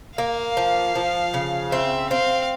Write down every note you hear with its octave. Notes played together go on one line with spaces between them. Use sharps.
A#3 F5
F3
F3
C#3
C4 E5
C4 F5